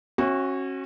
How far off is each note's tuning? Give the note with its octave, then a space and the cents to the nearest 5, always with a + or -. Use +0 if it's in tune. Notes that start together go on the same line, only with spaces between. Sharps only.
C#4 -35 F#4 +0 E5 -20